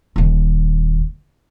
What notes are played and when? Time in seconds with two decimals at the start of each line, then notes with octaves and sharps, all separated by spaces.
0.16 D#1 D#2